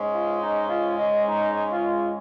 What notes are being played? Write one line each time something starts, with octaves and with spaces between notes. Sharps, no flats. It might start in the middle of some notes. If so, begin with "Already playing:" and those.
Already playing: G#2 G#3 C#4
F4
D#4
F4
D#5
D#4
F4